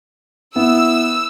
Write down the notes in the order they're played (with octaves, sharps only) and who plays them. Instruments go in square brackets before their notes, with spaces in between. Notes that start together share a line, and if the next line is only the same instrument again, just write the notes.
[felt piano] B3 [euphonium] E4 [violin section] E6